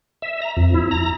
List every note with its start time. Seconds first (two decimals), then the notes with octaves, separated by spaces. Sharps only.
0.22 E5
0.42 A#5
0.57 F2
0.74 E4
0.91 A#5